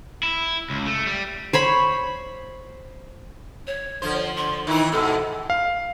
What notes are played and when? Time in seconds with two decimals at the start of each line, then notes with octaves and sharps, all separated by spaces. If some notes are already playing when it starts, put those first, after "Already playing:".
0.23 E4
0.70 C#2
0.86 A3
1.06 G3
1.53 C5 C#5 B5
3.67 C#5
4.02 D3 F3 C5
4.37 C6
4.67 D#3 E3 D#4 E4
4.92 G#2 B2 A4
5.50 F5